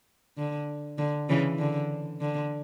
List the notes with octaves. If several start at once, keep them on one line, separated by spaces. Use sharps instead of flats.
D3
D3
C#3 E3
D3
D3